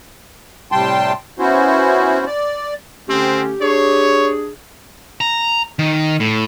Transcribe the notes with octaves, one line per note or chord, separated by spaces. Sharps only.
A2 C3 G3 G5 A5 C6
B3 C#4 E4 F#4 C5
D5
D3 A3 C4 C#4 G4
D4 G#4 C#5
A#5
D#3
A2